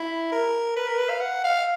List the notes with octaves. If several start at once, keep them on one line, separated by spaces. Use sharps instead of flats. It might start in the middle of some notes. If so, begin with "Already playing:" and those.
Already playing: E4
A#4
B4
A#4
B4
F5
F#5
F5